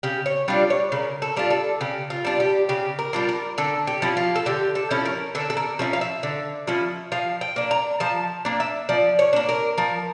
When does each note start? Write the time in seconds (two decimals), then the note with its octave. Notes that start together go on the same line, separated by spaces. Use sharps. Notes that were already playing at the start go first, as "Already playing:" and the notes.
0.03 C#3 G4
0.26 C#5
0.48 G3 D4 F4 D5
0.70 C#5
0.92 C#3 A#4
1.22 A4
1.36 G3 D4 F4
1.50 A4
1.81 C#3 G4
2.10 F4
2.25 G3 D4 F4
2.40 G4
2.69 C#3 G4
2.99 A#4
3.13 G3 D4 F4
3.29 A#4
3.58 D3 A4
3.87 G4
4.02 F3 C#4 E4
4.17 F4
4.35 A4
4.46 D3 G4
4.75 A4
4.91 F3 C#4 E4
5.05 A#4
5.35 D3 A4
5.50 A4
5.57 A#4
5.79 F3 C#4 E4 C#5
5.93 F5
6.01 E5
6.23 D3
6.67 F3 C#4 E4
7.12 F3 F5
7.41 G5
7.56 A#3 D4
7.71 A#5
8.00 F3 A5
8.45 A#3 D4
8.60 E5
8.89 F3 D5
9.19 C#5
9.33 A#3 D4
9.49 A#4
9.78 F3 A#4